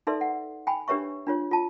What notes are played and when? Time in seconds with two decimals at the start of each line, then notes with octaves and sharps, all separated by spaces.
0.07 D#4 A4 B4 D5 E5 C6
0.21 F#5
0.67 G5 G#5 B5
0.88 D4 G4 B4 C#5 E5 C#6
1.27 D4 F4 C#5
1.51 F4 A5